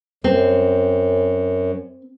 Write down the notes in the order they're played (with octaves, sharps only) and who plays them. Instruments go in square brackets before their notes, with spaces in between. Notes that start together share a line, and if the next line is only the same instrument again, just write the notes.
[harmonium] F#2 [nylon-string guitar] C4